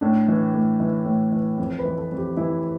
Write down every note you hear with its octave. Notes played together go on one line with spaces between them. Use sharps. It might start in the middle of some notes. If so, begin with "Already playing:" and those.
A2 D4
E3
A2
E3 E4
A2
E3
F2
B4
E3
A4
F2
G4
E3 E4